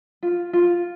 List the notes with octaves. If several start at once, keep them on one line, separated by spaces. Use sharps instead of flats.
F4
F4